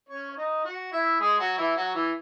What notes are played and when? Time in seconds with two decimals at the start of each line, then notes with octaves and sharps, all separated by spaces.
0.09 C#4 C#5
0.31 C#5
0.36 D#4 D#5
0.65 F#4 F#5
0.92 E4 E5
1.20 G#3 G#4
1.39 F#3 F#4
1.58 E3 E4
1.76 F#3 F#4
1.94 E3 E4